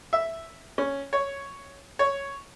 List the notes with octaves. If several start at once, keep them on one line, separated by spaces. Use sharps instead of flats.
E5
C#4
C#5
C#5